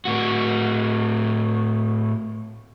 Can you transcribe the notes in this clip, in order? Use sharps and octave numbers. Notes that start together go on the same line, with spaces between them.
A2 F#4